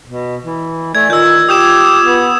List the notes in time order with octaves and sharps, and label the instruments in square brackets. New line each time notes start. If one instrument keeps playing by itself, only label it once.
[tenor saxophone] B2
E3
[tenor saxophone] A3 [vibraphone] D5 G#5 [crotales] G#6
[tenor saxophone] D#3 [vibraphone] F4 [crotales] E6 G6
[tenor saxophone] G4 [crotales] D#6 G6 E7
[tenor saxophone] B3